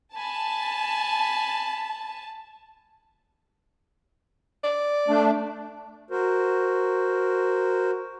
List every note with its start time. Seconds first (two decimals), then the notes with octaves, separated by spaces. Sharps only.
0.16 G#5 A5 B5
4.64 D5
5.08 A3 D4
6.11 F#4 A#4 C5